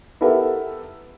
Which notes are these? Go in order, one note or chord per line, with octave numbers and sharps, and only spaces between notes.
B3 E4 G4 A4 A#4 E5